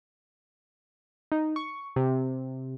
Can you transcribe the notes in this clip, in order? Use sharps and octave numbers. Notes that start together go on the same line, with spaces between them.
D#4
C#6
C3